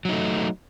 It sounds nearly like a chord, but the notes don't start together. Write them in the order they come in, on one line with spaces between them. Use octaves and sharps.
F#3 D#4 A3